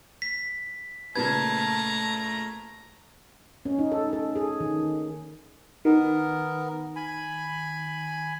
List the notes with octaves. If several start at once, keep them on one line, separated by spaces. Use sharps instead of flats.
B6
A#2 C#3 A3 B4 A5 A#5 G#6
C#4
D#4
A4
A4
G#4
D#3
D#3 B3 A#4
G#5 B5